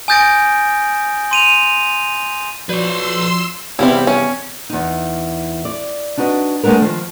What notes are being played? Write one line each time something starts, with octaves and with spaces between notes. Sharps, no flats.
G#5 D#6 G6 A6 A#6 D7
C6 D#7 F7
F3 F#4 B4 C#5 D5 C6 E6
E2 G2 C3 G3 C4 E4
C#4
E2 D#4
D5
D4 D#4 F#4 B4 D#5
G#3 A3 B3 D4 A#4
D#3 F3 C5